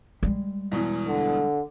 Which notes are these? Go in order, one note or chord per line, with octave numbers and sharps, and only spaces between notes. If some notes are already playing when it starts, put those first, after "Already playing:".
G3 G#3
E2 B2 E3
D3